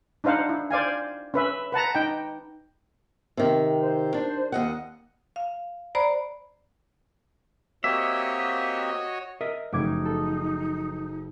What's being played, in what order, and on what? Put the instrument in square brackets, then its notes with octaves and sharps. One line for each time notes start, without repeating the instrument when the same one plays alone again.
[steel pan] D4 D#4 C5 F5 F#5
E4
C5 D5 F5 G#5
C#4 B4 E5
B4 F#5 A5 A#5
D#4 G5
[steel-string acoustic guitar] C3 D#3
[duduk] C5
[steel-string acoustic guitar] D4
D#2 D#5 F#5
[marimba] F5
C5 D5 A#5 B5
[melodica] A#3 C4 G4 [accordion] F#4 C#5 D#5 [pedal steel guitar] E5
[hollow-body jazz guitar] A#4 D#5 E5
[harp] F#1 D6 G#6 [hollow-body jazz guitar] F3 A3 [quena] D#4
[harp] A4